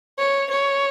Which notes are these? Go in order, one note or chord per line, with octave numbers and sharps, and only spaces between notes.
C#5
C#5